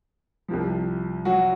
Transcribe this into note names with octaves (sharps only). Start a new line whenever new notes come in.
C2 C3 F3
F#3 F#4